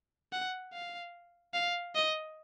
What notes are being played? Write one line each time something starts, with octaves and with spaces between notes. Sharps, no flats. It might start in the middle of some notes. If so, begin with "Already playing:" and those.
F#5
F5
F5
D#5